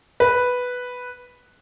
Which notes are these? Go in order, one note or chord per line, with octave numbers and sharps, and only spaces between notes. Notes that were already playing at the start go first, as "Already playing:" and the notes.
B4